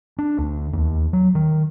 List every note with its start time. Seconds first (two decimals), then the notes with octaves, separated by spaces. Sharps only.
0.19 D4
0.39 D2
0.73 D#2
1.13 F#3
1.35 D#3